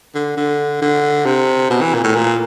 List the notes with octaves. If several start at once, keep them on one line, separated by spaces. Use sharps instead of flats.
D3
D3
D3
C3
B2
E3
A#2
A2
A#2